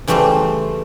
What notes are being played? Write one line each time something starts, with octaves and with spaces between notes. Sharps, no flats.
C#3 E3 G3 A3 G4 C5